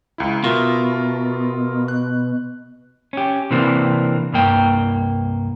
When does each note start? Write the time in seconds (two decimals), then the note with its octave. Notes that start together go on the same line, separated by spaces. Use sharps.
0.18 C#2 E4
0.44 B2 F4 A#4 E5
1.88 F#6
3.13 C#4 G4
3.51 C3 E3 A#3 C4 D4
4.32 C2 G2 A#3 G5